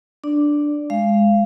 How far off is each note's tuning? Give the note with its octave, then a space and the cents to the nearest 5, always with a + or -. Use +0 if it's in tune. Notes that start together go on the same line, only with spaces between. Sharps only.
D4 +0 D5 +0
G#3 +0 F5 -20